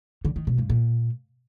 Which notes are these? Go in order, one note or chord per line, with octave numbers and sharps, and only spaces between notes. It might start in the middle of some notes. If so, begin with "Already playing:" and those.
D3
D#3
B2
G2
A#2